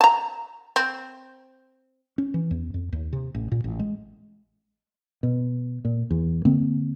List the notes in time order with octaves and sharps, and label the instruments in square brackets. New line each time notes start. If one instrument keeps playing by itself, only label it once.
[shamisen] A5 A#5
C4
[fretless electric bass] C#4
E3
E2
F2
D#2
C3
A1
A#2
A1
G#3
B2
A#2
E2
D3 A#3 C4